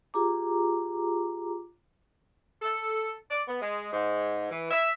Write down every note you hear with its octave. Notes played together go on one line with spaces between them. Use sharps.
F4 G4 G#4 A#5 D6
A4
D5
B3
G#3
G#2
E3
E5